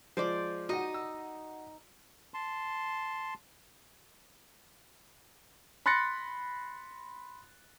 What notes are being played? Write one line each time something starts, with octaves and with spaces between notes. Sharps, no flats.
F3 G#3 C5 D5 D6
D#4 F#4 D#5 F#5
E6
A5 C6
B5 C6 F#6 A6 A#6 C#7